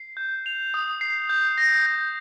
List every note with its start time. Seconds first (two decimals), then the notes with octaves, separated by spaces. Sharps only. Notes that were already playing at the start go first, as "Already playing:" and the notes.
Already playing: C7
0.17 G6
0.46 F7
0.74 D#6
1.01 C7
1.29 G6
1.58 A#6
1.86 G6